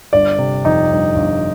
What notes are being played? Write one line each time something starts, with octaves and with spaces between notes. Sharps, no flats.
G1 D5
C3
F2 D#4
G1
G1